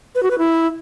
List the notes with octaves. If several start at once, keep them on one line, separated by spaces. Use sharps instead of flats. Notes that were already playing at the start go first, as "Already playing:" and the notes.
B4
F#4
B4
E4